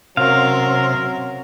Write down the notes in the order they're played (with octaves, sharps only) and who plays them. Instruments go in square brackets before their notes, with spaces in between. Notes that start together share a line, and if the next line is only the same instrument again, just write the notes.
[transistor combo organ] C3 [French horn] F#3 [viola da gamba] C#4 A#4 [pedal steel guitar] F5